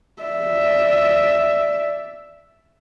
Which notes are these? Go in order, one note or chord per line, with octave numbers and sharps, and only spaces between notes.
D5 E5